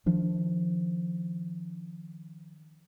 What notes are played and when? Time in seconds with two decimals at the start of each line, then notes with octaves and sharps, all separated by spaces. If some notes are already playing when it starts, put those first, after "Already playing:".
0.06 D#3 F3 D4